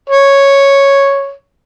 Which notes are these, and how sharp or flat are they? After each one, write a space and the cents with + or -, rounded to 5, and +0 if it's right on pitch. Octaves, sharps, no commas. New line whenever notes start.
C#5 -5